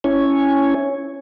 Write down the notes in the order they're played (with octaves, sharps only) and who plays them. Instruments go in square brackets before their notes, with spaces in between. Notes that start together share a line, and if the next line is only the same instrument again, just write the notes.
[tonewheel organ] C#4 E4 C#5 G#5